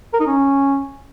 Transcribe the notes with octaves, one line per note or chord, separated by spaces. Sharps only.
A#4
D#4
C#4